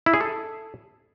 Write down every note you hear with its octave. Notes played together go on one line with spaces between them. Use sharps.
E4
G#4
A4